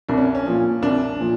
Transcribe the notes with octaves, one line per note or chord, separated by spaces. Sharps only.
C2 D4
C#4
C#4
A#2 F3
C2 D4
A#2 F3